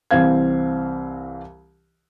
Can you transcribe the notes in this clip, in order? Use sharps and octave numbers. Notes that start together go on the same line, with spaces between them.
C2 E3 C4 F5 G#6